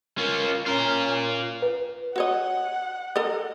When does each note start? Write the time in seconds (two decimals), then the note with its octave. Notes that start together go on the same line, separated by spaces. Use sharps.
0.18 C#4 F4 A#4
0.66 C#4 F4 A#4
1.62 B4
2.16 F#4 C#5 D#5 F#5
3.16 A4 A#4 D#5